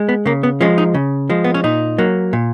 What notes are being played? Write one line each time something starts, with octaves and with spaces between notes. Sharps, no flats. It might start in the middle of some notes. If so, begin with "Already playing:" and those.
Already playing: G#3
B3
C#3 A#3
B3
F3 G#3 C#4
D#4
C#3
F3 G#3
B3
C#4
A#2 D#4
F#3 A#3
A#2